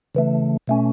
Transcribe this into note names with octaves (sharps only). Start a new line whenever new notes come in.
C#3 E3 A3
B2 A3 C#4